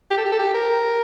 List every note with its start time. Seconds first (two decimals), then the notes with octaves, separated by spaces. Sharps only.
0.11 G4
0.18 A4
0.25 G4
0.32 A4
0.39 G4
0.54 A#4